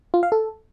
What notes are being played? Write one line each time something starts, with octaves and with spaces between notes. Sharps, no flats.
F4
F5
A4